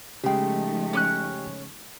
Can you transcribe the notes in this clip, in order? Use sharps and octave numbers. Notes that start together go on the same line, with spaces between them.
C#3 F3 G#3 A3 D#4 G4 G5
C#4 D6 F#6